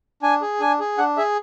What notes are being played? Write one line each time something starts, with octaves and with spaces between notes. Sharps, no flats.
D4 G#5
G#4
D4 G#5
G#4
D4 F#5
G#4 E5